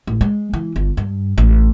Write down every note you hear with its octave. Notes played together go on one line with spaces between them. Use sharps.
A1
G#3
E3
G1
G2
A1